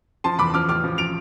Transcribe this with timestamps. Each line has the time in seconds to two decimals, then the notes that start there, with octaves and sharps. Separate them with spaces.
0.24 F3 A5 C6
0.39 E2 B5 D6
0.54 F3 D6 F6
0.69 A1 D6 F6
0.84 F3
0.98 F3 D7 F7